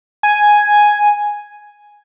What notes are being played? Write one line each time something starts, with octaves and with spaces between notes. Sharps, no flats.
G#5